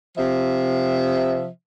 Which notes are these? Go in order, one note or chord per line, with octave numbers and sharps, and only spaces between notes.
C3 F3 E5